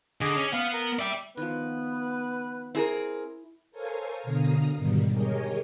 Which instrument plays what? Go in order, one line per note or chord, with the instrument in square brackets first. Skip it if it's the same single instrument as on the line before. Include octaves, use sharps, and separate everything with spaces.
[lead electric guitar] D3 [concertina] G#4 D#5 D6
[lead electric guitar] C#4
[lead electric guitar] B3 [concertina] F5
[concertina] A#4
[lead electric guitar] D5 G5 [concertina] E5
[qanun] D#3 F3 [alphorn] B3 [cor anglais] B4
[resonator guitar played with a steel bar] C4 G#4 A#4 [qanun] E4
[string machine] A4 A#4 C5 C#5 F5 G#5
B2 D3 F5 A#5 D#6
G#2 B2 D3 D#3 G3
G4 G#4 A#4 C#5 D#5